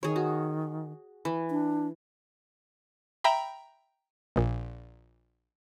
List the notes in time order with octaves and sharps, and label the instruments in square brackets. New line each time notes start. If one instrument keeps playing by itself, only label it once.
[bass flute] D#3 [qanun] G#4 C#5
[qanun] F#4
E3
[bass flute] D4
[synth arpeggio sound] E5 G5 A#5 B5
A#1 A#2